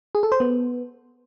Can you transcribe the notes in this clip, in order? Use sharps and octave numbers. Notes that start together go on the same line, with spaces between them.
G#4
A4
C5
B3